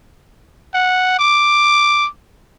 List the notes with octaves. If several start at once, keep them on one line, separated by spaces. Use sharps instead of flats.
F#5
D6